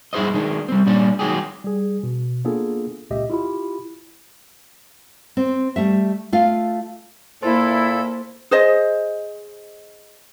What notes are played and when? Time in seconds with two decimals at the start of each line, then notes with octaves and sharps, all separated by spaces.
0.13 G2 E4 G#4 C5 D#5
0.34 D#3 G#3 D4
0.69 G3 C4
0.86 A#2 G3 C#4 D4
1.19 D#3 F#3 G#3 G4 G#4
1.64 G3 G#4
2.03 B2
2.45 A#3 B3 D4 F4 G#4 A4
3.10 C#2 A#2 G4 D#5 E5
3.30 E4 F4 G4 B5
5.37 C4
5.76 G3 A3 E5
6.32 A3 F4 F5
7.42 A#2 A#3 E4 A4 C5 C6 A6
8.51 G#4 C5 D#5